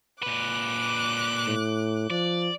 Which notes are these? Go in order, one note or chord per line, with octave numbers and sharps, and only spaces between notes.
A#2 B4 D6 F#6
A2
F3 D5